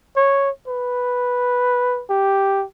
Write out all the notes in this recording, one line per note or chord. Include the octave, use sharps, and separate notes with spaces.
C#5
B4
G4